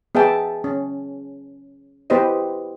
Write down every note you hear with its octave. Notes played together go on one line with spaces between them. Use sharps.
B3 G#4 E5 G5 A5
C#4
B3 E4 G4 B4 C5 D#5